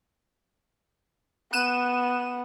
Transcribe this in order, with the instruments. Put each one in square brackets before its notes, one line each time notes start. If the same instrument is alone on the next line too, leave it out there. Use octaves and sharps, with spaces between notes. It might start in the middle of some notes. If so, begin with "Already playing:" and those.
[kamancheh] B3 [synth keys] F#6 D#7 E7